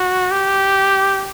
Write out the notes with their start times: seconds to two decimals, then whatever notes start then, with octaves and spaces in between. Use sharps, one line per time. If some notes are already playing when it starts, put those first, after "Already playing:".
Already playing: F#4
0.32 G4